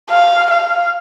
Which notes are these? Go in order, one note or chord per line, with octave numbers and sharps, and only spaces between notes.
F5
F5